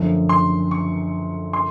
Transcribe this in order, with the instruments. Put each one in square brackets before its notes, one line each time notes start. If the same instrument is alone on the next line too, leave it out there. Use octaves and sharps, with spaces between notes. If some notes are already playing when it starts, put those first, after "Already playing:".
Already playing: [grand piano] F#2 D3 F3 A3 C#4
[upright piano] C6
C#6
C6